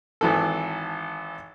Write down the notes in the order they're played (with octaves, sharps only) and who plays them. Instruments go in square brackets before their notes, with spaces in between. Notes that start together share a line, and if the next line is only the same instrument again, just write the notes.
[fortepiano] G#1 E3 A4